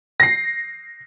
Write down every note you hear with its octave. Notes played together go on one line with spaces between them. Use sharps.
A#6 C7